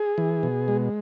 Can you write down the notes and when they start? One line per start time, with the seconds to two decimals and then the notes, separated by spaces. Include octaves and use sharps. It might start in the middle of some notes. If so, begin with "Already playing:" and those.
Already playing: G#4
0.18 E3
0.43 B2
0.68 G#3